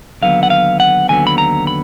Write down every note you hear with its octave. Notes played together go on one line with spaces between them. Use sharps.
D#2 D3 F#3 B3 F5
F#5
F5
F#5
D#2 D3 F#3 B3 G#5
B5
A#5
B5